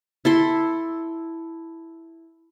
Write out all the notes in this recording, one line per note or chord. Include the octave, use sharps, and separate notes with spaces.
E4 A4 C6